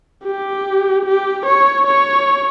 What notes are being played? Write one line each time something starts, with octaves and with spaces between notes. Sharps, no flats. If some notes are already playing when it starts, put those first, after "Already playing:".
G4
G4
C#5
C#5